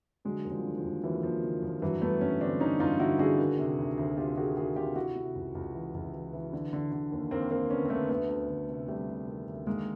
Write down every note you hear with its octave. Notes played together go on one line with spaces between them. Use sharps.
D3 F#3 G#3
D#2
F3 G3
D3
F3
D#2
D#2 E3 F#3
D#2 F3
D3
D#2 F3
G2 E3 F#3
G2 A3 B3
G2 B3 C#4
D3 C4 D4
D3 C#4 D#4
G2 D#4 F4
D3 E4 F#4
D3 F#4 G#4
D#3
C3
D2
D2
C3 F4 G4
D#3 F#4 G#4
D#3 F#4 G#4
C3 F4 G4
C3 E4 F#4
C3
C#2
C#2
E3
C#2
E3
E3
D3
D3
D3
D#2
D#2 A#3 C4
D#2 A#3 C4
D3 B3 C#4
C4
D3 A3 B3
D2 A3 B3
D2
D2
C3
C3 G3 A3
C3
D#3
D2
D#3 G#3 A#3